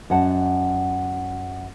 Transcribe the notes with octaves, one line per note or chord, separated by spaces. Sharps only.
F#2 D#5 F#5 A5